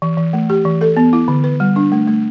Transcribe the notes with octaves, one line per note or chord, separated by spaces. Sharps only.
E3
E3
A3
G4
E3
A4
B3
E4
D3
B4
G3
D4
A3
A3